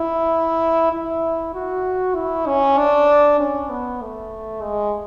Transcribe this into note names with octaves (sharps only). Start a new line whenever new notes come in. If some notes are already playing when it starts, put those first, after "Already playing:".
Already playing: E4
E4
F#4
E4
C#4
D4
C#4
B3
A3
G#3